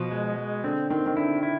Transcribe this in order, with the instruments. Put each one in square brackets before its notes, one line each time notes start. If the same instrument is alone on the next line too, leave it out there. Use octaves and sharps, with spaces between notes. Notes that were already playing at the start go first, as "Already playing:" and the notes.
Already playing: [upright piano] B2 [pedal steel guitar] F3
[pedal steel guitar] G#3
G#3
[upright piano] D3 [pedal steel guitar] C4
[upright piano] D#3 [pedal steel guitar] C4
[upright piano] D#3
[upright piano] D3 [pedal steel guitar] E4
[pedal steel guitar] E4